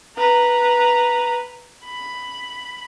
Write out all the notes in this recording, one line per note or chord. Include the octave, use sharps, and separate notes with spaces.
B4 A#5
B5